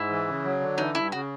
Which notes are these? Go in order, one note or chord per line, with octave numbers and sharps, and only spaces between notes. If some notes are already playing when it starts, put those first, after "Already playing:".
Already playing: G#2 E4
E3
C#3
F#3
D3
E3 D#4
G2 E4
C#3 F#4